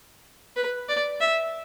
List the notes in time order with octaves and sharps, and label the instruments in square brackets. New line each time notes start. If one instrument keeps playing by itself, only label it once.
[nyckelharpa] B4
D5
E5